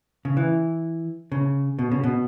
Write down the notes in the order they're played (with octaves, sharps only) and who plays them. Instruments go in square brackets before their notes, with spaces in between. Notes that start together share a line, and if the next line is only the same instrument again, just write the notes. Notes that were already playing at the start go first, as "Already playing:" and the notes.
[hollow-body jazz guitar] C#3
E3
C#3
B2
C#3
B2